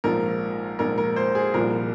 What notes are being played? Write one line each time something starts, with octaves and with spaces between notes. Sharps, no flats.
A#1 G#2 F3 A#4
A#1 G#2 F3 A#4
A#4
C5
G#4
C2 A#2 F3 A#4